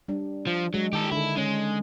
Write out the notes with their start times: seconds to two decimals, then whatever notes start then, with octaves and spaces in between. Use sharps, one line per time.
0.08 G3 D4
0.47 F3
0.74 F#3 G#3
0.93 D#3 G4 A4
1.12 D3 E4 A4
1.37 G#3 C#4